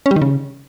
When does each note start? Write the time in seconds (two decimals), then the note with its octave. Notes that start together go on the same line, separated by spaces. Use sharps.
0.06 C#4
0.11 G3
0.16 D#3
0.22 C#3